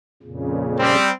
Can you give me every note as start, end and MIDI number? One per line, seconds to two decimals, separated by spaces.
0.23 0.96 41
0.23 0.96 46
0.23 0.96 49
0.79 1.10 55
0.79 1.10 60